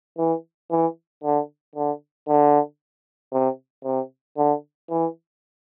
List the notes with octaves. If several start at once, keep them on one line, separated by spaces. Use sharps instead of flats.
E3
E3
D3
D3
D3
C3
C3
D3
E3